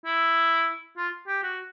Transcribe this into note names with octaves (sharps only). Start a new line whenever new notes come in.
E4
F4
G4
F#4